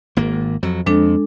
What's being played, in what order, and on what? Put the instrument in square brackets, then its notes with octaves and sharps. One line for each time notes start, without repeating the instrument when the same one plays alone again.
[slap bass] G#1 A#3
F2 F#3
[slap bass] F2 [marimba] G#3 D4 A4